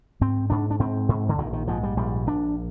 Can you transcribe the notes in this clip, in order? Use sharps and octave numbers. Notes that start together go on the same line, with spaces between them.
G#2 C4
G#2 D4
D4
G#2 C4
G#2
D3
A#1 D#3
D#3
G#2 F3
G3
A#1 G3
A#1 D4